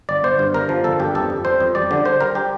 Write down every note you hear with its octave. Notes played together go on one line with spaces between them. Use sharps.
G1 D5
G1 C5
G2
G1 A#4
F3
G1 A4
G2 G4
F2 A4
F2
G3 C5
F2
G3 D5
D3
D3 C5
G3 A#4
G4